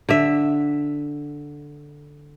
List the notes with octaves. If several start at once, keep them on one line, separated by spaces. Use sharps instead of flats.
D3 E5